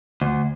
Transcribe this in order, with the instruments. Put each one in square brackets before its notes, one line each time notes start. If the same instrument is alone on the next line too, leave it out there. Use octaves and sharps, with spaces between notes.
[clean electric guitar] D2